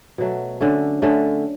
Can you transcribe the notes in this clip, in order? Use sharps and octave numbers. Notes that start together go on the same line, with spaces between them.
B2 F#3 A3
D3 A3 C#4
D3 A3 C#4